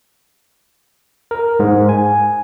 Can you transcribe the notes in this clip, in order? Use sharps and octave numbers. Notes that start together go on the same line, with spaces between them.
A#4
G#2
G#5